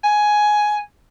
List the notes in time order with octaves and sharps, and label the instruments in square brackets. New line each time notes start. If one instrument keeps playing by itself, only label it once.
[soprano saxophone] G#5